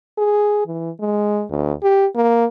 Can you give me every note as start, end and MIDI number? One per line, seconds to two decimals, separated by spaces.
0.18 0.63 68
0.67 0.90 52
1.00 1.44 56
1.50 1.73 38
1.83 2.06 67
2.15 2.45 58